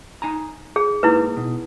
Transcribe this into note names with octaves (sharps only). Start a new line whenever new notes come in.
D#4 G#5 A#5
G#4
G#2 A#3 D#4 E4 B4
B2